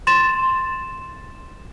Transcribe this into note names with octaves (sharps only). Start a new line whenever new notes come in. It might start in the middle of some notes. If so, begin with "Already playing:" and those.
C6 A6 E7